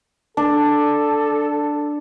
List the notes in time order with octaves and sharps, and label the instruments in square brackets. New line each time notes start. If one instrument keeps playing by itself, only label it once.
[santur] D4 [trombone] A4